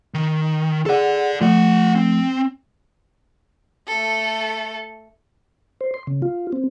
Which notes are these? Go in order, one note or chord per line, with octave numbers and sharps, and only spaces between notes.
D#3
G#4 A4 D5 F#5
F3 A3 F4 F#5
C4
A3 A4
C5
C6
C#3
F4
C4